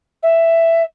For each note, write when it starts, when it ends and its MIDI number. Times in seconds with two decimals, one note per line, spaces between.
0.23 0.82 76